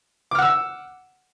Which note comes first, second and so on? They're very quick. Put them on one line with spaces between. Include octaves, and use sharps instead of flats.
D6 F6 F#5 E6